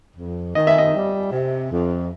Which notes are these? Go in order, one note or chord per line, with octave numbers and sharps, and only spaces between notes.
F2
D#3 D#5
E5
D#5
G3
C3
F2